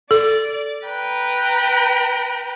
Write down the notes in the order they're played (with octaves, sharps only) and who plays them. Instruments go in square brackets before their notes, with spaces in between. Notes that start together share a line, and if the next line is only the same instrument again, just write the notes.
[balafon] A4 [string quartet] D5
[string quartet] B4 G5 A#5